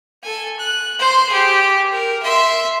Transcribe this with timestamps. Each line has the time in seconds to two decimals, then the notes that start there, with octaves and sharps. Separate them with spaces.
0.23 A4 G#5
0.59 F#6
0.99 C5 C6
1.29 G4 G#4
1.92 A#4
2.23 E5 C6